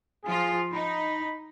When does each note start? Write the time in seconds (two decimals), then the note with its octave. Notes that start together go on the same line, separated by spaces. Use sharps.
0.24 F3 F4 G#4
0.74 D#4 B5